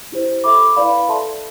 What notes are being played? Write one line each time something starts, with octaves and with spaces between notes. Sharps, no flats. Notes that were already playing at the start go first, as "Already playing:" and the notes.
E4 G4 C5
A4 E5 B5 D6
E4 B4 D5 F5 B5
A4 E5 A5 C6